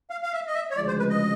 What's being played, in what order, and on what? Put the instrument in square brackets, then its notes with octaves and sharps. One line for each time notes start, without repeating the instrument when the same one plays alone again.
[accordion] F5
F5
E5
D#5
E5
C#5
[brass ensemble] D2 C#3 F3 G#3 [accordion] D5
[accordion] C5
B4
D#5